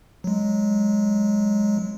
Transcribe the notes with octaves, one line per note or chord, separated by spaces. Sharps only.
F#3 G#3